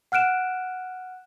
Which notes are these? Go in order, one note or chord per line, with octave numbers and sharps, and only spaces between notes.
F#5 F6 F#6 D7 E7